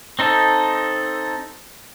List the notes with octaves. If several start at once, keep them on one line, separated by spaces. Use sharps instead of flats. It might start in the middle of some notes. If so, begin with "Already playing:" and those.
C4 D#4 A4